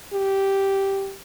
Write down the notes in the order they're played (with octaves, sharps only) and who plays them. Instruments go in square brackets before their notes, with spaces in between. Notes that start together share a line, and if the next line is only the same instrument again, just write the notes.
[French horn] G4